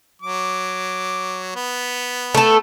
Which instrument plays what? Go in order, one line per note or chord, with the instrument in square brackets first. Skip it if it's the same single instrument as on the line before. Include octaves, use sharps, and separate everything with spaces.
[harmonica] F#3 D6
B3
[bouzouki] A3 A4